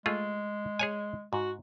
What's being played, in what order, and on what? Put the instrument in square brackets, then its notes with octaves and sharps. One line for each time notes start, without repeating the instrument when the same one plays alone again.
[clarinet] G#3 [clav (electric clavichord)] A3 F4 G#4
[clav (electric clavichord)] G#4 C#5 G#5
[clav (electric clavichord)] G#2 [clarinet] F#4